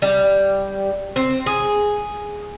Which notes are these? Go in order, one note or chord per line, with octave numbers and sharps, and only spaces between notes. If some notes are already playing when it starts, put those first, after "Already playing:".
G3
C4
G#4